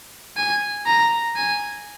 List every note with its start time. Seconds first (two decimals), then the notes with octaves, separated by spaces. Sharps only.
0.37 G#5
0.86 A#5
1.36 G#5